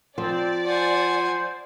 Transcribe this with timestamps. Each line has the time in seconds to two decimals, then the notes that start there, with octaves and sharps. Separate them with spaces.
0.18 F3 C4 D5
0.65 C5 F#5 G#5